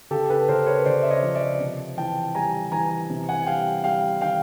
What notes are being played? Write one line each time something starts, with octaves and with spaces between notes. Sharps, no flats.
C#3 G4 A4
A4 B4
C#3 A#4 C5
B4 C#5
C#3 C5 D5
E5
C#5 D#5
F3
D5 E5
C3
E3 G5 A5
G3 G#5 A#5
E3 G#5 A#5
C3
F#5 G#5
G#5
G3 F5 G5
G3 F5 G5
D#3 F5 G5